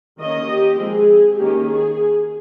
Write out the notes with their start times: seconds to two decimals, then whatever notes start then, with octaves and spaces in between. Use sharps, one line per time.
0.19 D#3 A#3 C#4 D#5
0.49 G4
0.79 F3 G#3 C4 G#4
1.39 D#3 A#3 C#4 G4
1.69 G#4